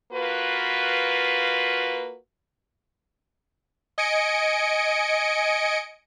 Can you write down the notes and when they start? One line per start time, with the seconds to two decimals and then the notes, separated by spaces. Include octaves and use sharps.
0.12 A#3 F4 F#4 B4
3.98 D#5 G#5 C#7 D7